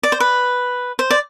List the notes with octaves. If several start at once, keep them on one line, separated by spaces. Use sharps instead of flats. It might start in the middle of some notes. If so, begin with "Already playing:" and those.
D5
C5
B4
C5
D5